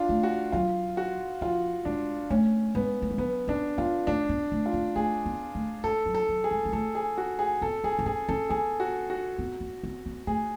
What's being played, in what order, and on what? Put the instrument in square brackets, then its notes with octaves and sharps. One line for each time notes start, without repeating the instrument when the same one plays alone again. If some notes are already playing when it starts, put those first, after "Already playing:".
Already playing: [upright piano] D4 F4
[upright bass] A3
[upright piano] F#4
[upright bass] F#3 [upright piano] F4
[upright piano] F#4
[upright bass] F3 [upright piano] F4
[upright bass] G#3 [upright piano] D4
[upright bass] A3 [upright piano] C#4
[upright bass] G#3 [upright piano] B3
[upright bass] A3
G#3
[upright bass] F#3 [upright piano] B3
[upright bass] C#4 [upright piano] D4
[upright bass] B3 [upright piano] F4
[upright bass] A3 [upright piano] D4
[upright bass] B3
A3
[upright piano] F4
[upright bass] A3
[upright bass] A3 [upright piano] G#4
[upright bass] B3
A3
[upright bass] G#3 [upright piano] A4
[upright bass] F#3
[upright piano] A4
[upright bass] F#3
[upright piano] G#4
[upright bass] G#3
G#3
[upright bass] A3 [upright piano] A4
[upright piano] G#4
F#4
G#4
[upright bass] B3 [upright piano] A4
[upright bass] B3 [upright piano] G#4
[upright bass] B3
[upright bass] C#4 [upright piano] G#4
[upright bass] C#4 [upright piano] A4
[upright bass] B3 [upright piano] G#4
[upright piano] F#4
F#4
[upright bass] B3
B3
B3
B3
[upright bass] A3 [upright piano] G#4